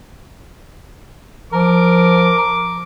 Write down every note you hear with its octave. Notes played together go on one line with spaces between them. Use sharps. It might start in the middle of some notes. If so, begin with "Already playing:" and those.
F3 A#4 D6